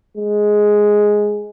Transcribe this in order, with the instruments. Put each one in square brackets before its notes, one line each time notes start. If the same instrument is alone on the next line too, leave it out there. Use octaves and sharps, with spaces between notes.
[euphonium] G#3